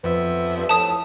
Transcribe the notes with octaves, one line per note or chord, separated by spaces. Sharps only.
F2 F3 B3 E5
G2
A2 A5 D#6